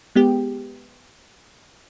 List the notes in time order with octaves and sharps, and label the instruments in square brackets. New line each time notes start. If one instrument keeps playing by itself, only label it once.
[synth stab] G#3 B3 G4